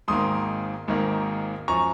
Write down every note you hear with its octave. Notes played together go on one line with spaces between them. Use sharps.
G#1 G#2 D#3 A#3 C6 D#6
G#1 G#2 D#3 A#3
F#2 F3 A#5 C#6